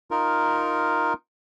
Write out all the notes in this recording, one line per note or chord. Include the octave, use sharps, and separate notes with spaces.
D#4 F4 A#4